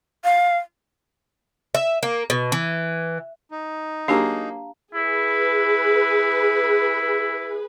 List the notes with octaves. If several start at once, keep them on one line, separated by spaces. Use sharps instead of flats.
F5
E5
A#3
B2
E3
D#4
F#3 A#3 D4 G4 G#4 F5 A5 A#5
E4 G#4 B4